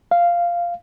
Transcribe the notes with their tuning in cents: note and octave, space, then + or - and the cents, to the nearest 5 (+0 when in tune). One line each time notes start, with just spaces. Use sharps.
F5 -5